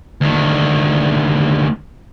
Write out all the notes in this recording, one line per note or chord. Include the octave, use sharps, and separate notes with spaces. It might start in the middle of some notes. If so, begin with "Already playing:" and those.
D2 D#3